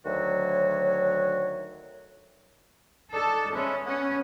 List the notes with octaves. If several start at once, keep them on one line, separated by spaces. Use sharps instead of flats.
D2 D#3 F#3 F#4 C#5
D4 D#4 A4
G#3 C#4 B4 E5
B3 C#4 F#5